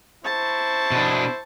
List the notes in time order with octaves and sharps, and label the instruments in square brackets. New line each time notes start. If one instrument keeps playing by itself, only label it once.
[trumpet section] E4 C5 [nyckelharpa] A5 C#6
[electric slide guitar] B2 D4